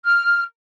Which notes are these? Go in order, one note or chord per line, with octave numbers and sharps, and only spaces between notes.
F6